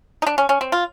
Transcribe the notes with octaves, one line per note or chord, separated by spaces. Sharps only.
D#4
D4
C#4
C#4
C4
F4